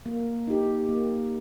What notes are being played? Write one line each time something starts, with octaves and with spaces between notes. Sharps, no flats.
A#3
D#4 G4
A#3